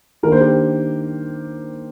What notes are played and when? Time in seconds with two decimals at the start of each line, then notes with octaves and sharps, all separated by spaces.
0.23 D#3 A#3 D4 A#4
0.32 C5
0.41 G4 A#4